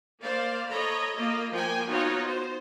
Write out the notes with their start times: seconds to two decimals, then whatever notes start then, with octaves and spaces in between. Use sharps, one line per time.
0.21 A#3 C5 D5 F5
0.69 A4 C#5 D#5 A#5 B5
1.17 A#3 F4 D#5
1.53 F3 A#3 G5 G#5
1.87 B3 D#4 F4 F#4 C#5
2.25 C5